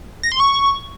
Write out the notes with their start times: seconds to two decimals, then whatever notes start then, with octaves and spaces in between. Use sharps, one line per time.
0.23 A#6
0.32 C6
0.40 C#6